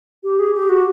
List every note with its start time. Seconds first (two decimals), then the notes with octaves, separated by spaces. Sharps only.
0.24 G4
0.39 G#4
0.54 G4
0.69 F#4